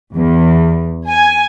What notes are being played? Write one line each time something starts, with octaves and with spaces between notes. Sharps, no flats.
E2
G#5